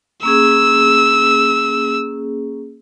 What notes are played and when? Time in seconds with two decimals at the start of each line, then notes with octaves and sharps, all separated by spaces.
0.23 A#3 C#4 G#4 E6